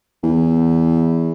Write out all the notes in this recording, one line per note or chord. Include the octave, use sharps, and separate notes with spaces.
E2